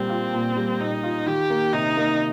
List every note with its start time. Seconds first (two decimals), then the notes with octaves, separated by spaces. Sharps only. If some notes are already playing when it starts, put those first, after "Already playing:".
Already playing: A#2 G3 A#3 C4
0.10 F4
0.34 A#2
0.56 G3
0.79 A#2 D#4
1.03 F4
1.26 D#3 G4
1.50 A#3
1.73 C3 D#4
1.97 A#3